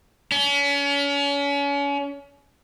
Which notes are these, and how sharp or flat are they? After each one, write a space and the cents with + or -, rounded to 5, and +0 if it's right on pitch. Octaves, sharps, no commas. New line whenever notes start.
C#4 +35